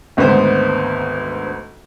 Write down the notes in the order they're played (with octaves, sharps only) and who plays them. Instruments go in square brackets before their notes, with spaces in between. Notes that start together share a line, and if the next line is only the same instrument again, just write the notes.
[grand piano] G#1 D2 B3 C5